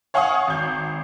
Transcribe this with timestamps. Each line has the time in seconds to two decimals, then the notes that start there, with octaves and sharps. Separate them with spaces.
0.14 C#5 F5 F#5 G#5 C#6 D#6
0.48 G#1 G6